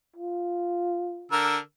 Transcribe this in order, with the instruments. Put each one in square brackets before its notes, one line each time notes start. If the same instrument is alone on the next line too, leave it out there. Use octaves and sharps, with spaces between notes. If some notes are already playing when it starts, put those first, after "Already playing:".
[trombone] F4
[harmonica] D3 A#4 E6